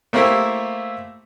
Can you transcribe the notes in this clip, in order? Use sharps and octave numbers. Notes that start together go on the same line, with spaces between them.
A3 A#3 C4 E4 G4 E5